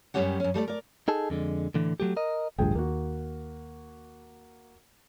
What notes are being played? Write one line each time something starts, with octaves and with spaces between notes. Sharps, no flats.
F#2 F3 G3 C#4 G4 F#5
F#2 C#4
G3 A3 E4 D5
A#4 D5
D#4 G#4 A4
F2 D3 G#3
A2 D3 E3
F#3 A3 G4
A#4 D#5
A1 D2 G2 F3 G#4 G5
D#2 A#3 F#4